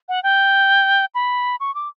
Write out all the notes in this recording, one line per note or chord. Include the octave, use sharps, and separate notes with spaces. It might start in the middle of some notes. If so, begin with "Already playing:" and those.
F#5
G5
B5
C#6
D6